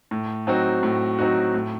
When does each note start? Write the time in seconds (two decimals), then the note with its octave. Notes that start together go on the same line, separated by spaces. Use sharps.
0.11 A2
0.47 F#3 C4 D#4 F#4
0.83 A2
1.19 F#3 C4 D#4 F#4
1.54 A2